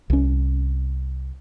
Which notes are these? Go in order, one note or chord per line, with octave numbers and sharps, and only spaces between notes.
C2 C#4